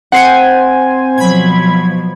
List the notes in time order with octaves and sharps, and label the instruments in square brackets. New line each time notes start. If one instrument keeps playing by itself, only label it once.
[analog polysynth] C4 C5 G#5 [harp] F#5 C7 C#7
[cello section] B2 F3 F#3 [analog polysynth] B5 G#6